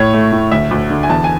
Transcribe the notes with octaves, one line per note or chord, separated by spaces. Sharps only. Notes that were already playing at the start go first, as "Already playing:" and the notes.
Already playing: A2 C#5
A3
A2
D2 E5
D2
D3
G#5
E2 A5
G#5